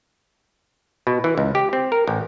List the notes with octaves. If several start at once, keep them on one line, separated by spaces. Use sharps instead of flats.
B2
E3
C#2
G4
C4
A#4
A1